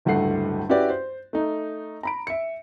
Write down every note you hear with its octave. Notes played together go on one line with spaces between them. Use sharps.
D1 C#2 G2 A3 F#5 C7
C#4 E4 F#4 G4 B4 D5
C5
A3 D#4
A#5 B5 D7
E5 C#7